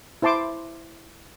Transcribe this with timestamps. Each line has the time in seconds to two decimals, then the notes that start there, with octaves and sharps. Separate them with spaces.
0.22 E4 C5 A5 C6 D6